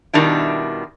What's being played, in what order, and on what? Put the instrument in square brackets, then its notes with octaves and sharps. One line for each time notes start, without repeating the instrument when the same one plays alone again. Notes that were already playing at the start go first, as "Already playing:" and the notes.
[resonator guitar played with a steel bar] B2 D#3 G3 D4 E4